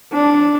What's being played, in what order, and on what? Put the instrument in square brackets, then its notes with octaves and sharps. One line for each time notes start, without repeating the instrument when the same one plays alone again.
[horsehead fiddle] D4